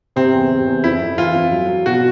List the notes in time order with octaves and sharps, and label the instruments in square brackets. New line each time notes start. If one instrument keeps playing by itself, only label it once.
[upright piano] C3 [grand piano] C4
[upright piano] E2
C3
E2
[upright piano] F2 [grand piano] E4
[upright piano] F2
[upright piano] E3 [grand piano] F4
[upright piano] F2
F#3
F#3
[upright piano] B2 [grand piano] F#4